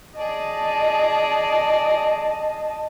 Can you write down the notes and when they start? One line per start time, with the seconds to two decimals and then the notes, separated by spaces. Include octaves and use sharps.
0.17 G#4 D5 D#5 A5